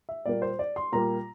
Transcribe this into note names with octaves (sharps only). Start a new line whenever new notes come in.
E5
A#2 G3 A#3 D5
C5
D5
C6
A#2 G3 A#3 A#5